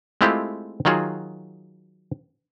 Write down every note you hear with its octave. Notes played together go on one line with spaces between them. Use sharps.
G#3 A3 C4 E4 F4 G4
D#3 F#3 F4 F#4 G#4